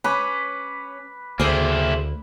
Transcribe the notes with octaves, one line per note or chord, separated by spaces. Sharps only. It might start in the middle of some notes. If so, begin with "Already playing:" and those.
C#4 B4 B5 D6
D2 A#3 E4 G#4 C5